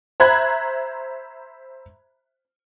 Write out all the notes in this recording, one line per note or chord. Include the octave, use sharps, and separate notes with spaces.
C5 E5 A#5 B5 F#6 G#6